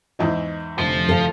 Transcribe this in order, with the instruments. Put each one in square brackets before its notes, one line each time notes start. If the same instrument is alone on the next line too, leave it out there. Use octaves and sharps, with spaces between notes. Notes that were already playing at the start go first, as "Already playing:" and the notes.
[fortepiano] E2 G#2 E3 [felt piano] D#5
[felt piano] F1 D3 [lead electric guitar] F3
[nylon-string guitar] A4 F5